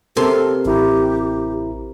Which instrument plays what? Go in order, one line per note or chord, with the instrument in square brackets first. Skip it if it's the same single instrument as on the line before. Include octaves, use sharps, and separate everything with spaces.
[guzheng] C3 C6 [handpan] C4 A#4 [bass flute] A4
[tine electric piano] A1 E4 A#5 [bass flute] G4